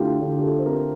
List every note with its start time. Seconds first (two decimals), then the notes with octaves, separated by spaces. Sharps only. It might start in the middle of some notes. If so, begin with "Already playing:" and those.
Already playing: D3 A3 E4 F4 G4
0.21 D3 F4
0.37 G4
0.43 A4
0.59 C5
0.66 C4 A#4